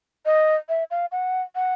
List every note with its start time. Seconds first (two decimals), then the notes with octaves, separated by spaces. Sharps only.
0.26 D#5
0.69 E5
0.91 F5
1.12 F#5
1.55 F#5